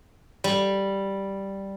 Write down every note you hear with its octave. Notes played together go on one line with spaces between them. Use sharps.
G3